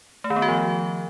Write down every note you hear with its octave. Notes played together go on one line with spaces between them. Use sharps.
A3
D#3
B3
F#4
F3